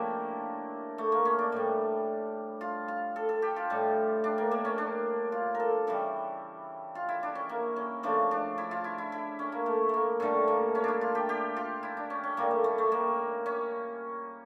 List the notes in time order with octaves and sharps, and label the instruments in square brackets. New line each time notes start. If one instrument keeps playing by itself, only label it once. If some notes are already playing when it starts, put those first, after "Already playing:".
Already playing: [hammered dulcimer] C#3 F3 A3 A#3 D4 E4 G4
A3
A#3
C#4
D4
A2 G3
F4
F4
A4
A4
G4
F4
A2 G3
D4
A#3
A#3
C#4
D4
F4
A#4
A4
C#3 E3 G3
F4
E4
D4
C#4
A#3
C#4
C#3 F3 A3 D4
D4
E4
F4
E4
E4
E4
C#4
A#3
A3
A3 A#3
G2 D3 A3 C#4
A#3
C#4
D4 E4
F4
G4
G4
F4
E4
D4
C#4
C#4
A#2 G3 A#3
A3
A3
A3
A#3
C#4